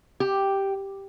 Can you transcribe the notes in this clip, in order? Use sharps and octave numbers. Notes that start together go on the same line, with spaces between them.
G4